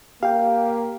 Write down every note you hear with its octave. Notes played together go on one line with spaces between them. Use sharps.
A#3 G4 F5 G5